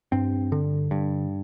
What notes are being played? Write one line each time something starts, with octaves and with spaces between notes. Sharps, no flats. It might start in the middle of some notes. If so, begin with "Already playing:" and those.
G2 C4
D3
G2